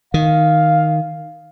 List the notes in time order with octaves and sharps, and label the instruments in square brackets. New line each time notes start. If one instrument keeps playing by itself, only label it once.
[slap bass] D#3 [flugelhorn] F5